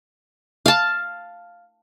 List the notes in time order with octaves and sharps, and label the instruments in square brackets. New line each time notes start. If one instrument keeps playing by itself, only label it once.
[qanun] F5 A5